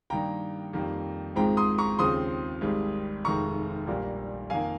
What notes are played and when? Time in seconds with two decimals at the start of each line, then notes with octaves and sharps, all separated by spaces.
0.10 G2 D#3 A#3 G5 A#5
0.73 F2 D#3 G3 A#3
1.36 G#1 G#2 F3 G#3 C4 G5 A#5
1.57 C6 D#6
1.78 A#5 C#6
1.99 D#2 C#3 F3 C4 C6 D#6
2.61 G#1 G#2 G3
3.25 F1 F2 D#3 G#3 A#5 C#6
3.87 A#1 A#2 G3 A#3
4.50 F2 D#3 A#3 F5 G#5